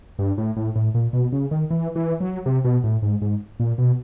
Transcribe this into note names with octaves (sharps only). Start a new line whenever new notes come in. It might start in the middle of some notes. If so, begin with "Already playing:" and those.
G2
A2
A2
A2
A#2
B2
C#3
D#3
E3
E3
F#3
C3
B2
A2
G#2
G#2
A#2
B2